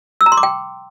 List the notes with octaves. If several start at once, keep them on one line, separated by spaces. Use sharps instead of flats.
E6
A#5
C6
D6
G5